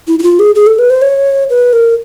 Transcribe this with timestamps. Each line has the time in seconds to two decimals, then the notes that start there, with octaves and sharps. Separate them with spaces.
0.07 E4
0.19 E4
0.23 F4
0.39 G#4
0.55 G#4
0.67 A4
0.79 B4
0.90 C5
1.02 C#5
1.50 B4
1.73 A#4